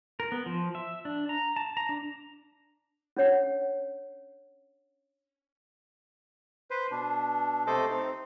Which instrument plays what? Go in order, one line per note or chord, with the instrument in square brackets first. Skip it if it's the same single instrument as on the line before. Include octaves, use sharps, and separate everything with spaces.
[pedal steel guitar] A#4
B3
F3
E5
D4
A#5
A5
A#5
D4
[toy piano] C#4 D4 C#5 F#5
[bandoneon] B4 C5
B2 D4
C3 A3 A4 C5 D#5 D6
C4 D#4